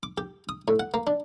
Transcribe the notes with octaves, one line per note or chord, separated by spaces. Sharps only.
D6
G4
D#6
A2
F#5
A#3
D4